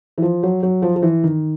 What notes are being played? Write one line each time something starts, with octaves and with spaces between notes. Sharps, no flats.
E3
F3
F#3
F#3
F3
F3
E3
D#3